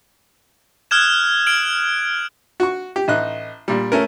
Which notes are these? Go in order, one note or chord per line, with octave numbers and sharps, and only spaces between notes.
D#6 F6 F#6 G#6 E7
F6 D7 F#7
F#4 C#6
G4
A1 D#4 F#6
A#2 G3
A3 C#4 A#4